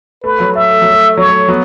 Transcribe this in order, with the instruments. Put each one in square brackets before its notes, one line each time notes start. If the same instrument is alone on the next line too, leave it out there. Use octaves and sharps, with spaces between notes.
[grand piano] A3 [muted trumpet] B4
[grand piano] F#3
[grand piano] A3 [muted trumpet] E5
[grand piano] A3
F#3
A3
[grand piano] F#3 [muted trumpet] C#5
[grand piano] A3
F#3 B3